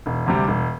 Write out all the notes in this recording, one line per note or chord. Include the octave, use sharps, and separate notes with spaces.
E1
D2 C3 G3
E1